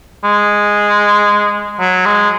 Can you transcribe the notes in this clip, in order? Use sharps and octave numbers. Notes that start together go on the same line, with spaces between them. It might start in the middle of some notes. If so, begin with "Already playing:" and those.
G#3
F#3
G#3